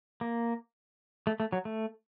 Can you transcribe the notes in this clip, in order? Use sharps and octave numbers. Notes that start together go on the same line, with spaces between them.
A#3
A3
A3
F#3
A3